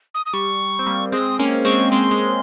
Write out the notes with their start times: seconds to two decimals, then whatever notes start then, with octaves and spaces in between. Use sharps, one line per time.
0.15 D#6
0.26 D#6
0.33 G3 C#6
0.79 C4
0.86 G3 A#3
1.12 G#3 C4 D#6
1.39 A#3 C#4
1.65 G#3 C4 C#6
1.91 G#3 C4 C6
2.11 G#3